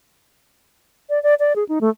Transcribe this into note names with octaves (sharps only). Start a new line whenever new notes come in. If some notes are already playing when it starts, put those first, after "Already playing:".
D5
D5
D5
G#4
D#4
A3